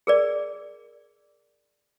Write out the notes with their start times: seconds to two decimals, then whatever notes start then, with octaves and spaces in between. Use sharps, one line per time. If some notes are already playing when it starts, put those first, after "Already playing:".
0.07 G#4 A#4 D5